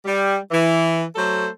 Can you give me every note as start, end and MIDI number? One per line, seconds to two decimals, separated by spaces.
0.05 0.35 55
0.51 1.03 52
1.16 1.47 54
1.16 1.47 57
1.16 1.47 69
1.16 1.47 72